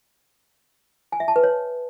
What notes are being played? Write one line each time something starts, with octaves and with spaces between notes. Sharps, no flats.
G#5
E5
A5
B4
C#5